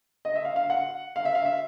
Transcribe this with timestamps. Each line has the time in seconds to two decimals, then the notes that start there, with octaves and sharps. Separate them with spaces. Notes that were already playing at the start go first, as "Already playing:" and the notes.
0.25 D#5
0.35 E5
0.45 F5
0.56 F5
0.70 F#5
1.16 F5
1.25 E5
1.35 F5
1.45 E5